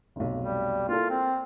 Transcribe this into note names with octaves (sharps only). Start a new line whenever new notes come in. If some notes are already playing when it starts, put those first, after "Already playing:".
F1 B1
G3
A#3 E4 F4 A4
C4